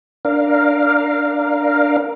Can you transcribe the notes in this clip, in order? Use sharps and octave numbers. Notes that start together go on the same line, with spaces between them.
D4 A#4 F5